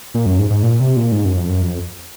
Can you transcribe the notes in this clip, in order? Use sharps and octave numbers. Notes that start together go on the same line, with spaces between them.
A#2
F#2
G#2
G#2
A#2
C3
A#2
G#2
F#2
F2
F#2
F2